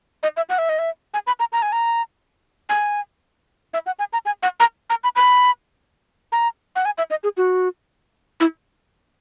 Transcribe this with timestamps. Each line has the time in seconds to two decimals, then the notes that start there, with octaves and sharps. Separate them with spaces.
0.23 D#5
0.37 E5
0.49 F#5
0.58 E5
0.69 D#5
0.79 E5
1.14 G#5
1.27 B5
1.40 A#5
1.53 A#5
1.62 G#5
1.72 A#5
2.69 G#5
3.74 E5
3.86 F#5
3.99 G#5
4.13 A#5
4.26 G#5
4.43 F#5
4.60 A#5
4.90 A#5
5.04 B5
5.16 B5
6.32 A#5
6.76 F#5
6.85 G#5
6.98 E5
7.10 D#5
7.24 G#4
7.37 F#4
8.40 E4